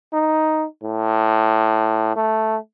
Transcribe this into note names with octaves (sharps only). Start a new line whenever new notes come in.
D#4
A2
A3